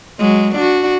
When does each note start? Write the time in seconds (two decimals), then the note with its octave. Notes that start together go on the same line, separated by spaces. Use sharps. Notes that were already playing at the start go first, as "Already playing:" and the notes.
0.19 F#3 G#3
0.55 D4 F#4